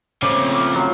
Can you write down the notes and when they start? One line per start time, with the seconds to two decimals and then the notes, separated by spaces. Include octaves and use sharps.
0.23 A#2 C#3 F3 A3 C4 C#5 D6
0.75 F#3 F4